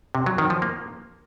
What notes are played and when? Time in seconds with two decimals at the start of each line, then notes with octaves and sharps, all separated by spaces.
0.15 C3
0.26 F#3
0.38 D#3
0.50 F3
0.62 A#3